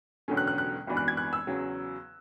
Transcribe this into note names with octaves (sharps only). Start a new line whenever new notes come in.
E1 E2 D3 F#3 C#4
F#6
F#6
F#6
G#1 F#2 E3 B3 D4
F#6
G#6
F#6
E6
E2 C#3 F#3